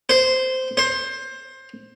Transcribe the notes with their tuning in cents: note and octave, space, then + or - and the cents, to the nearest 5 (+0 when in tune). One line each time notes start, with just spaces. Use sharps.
C5 -10
C5 +20